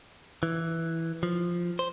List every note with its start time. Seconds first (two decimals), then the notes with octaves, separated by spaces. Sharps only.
0.43 E3
1.23 F3
1.79 C5